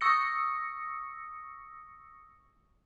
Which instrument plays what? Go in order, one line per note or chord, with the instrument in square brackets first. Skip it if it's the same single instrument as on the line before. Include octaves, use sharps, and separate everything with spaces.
[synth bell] C#6 D#6 E6 A#6 C#7